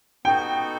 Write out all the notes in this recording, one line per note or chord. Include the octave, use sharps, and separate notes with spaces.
B3 D#4 F#4 A4 G5